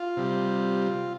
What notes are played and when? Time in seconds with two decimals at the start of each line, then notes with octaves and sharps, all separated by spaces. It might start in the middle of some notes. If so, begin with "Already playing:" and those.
Already playing: F4
0.17 C3 G3